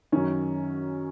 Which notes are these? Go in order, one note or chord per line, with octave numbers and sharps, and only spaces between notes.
F#2 D#3 C#4